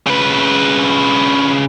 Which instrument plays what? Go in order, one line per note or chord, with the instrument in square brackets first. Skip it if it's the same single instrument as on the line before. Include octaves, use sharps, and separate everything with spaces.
[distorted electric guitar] C#3 B4